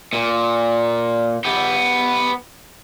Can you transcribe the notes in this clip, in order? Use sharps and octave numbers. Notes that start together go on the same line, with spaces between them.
A#2
B3 G4